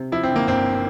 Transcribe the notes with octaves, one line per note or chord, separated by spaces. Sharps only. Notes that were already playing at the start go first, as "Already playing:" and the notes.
Already playing: C3
F3 E4
C4
D3
A#3
G1 C4